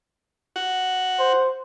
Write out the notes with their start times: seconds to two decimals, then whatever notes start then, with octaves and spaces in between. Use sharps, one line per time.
0.56 F#4
1.19 C5